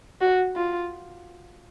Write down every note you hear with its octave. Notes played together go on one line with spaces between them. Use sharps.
F#4
F4